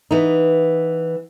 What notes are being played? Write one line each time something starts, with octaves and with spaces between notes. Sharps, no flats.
E3 B3 D#4